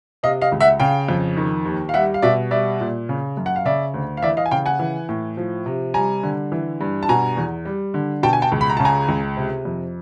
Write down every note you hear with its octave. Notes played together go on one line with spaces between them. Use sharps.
C3 D#5 F5
D#5 F5
C#2
E5 F#5
C#3 F5 G5
F2
D#3
D#2
F5
G3 E5 F#5
F5
B2 D5 E5
G3 D5 E5
A#2
C#3
F#2
F#5
F5
C#3 D5 E5
D2
F5
E3 D5 E5
D#5 F5
G#5
C#3 F5 G5
F#5 G#5
E3
A2
F3
C3
G3 G#5 A#5
D3
E3
G2
A5
B2 G#5 A#5
E2
G3
D3
B2 G5 A5
G#5
G5 A5
C#2
B5
A#5
C#3 A5
G#5 A#5
C#2
C3
F2